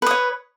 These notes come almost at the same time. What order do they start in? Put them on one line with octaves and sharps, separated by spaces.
B4 D#6 C#5